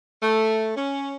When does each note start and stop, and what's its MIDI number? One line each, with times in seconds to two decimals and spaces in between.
0.22 0.72 57
0.76 1.15 61